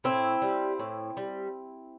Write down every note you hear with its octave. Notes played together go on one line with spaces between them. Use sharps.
A2 C4 E4
G3
A2
G3